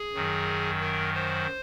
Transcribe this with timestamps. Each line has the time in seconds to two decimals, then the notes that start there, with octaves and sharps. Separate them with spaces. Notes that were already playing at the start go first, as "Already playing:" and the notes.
Already playing: G#4
0.14 F#2 D#3 F#3
0.80 A#4
1.14 C5